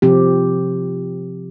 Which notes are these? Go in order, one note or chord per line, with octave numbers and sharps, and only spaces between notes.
C3 F3 C4 G4